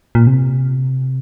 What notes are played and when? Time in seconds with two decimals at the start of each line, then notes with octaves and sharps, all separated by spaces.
0.15 A#2
0.27 C3